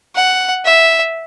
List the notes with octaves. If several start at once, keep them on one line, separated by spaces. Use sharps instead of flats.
F#5
E5